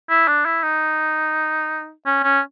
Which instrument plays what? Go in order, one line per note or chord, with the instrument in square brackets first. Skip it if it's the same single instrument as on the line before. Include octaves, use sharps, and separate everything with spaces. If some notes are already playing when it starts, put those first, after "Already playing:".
[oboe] E4
D4
E4
D#4
C#4
C#4